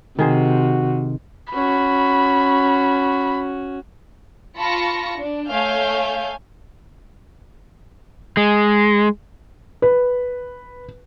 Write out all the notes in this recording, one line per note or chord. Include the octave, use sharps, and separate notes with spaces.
C3 D#3 F#4 G#4 C5
C#4 F#4 B5
F4 A5 B5 C#6 A#6 C#7
D4
A3 C#5 F5 G#5 G6
G#3
B4